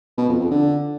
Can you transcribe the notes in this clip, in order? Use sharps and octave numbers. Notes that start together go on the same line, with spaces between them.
B2
F2
F2
D3